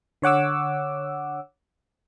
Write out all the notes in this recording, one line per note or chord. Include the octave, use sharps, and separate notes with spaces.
D3 C#5 F#5 D6 E6